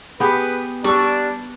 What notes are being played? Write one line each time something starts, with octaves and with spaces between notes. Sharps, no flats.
B3 G4 G#4 B4
G3 D4 C#6 E6